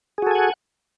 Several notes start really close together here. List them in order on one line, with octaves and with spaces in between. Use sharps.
G#4 F#4 A4 G#5 F#5